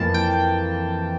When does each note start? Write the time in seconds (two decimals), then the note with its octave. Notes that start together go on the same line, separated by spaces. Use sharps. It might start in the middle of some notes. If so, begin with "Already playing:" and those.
Already playing: F2 E3 A#3 A5
0.14 G5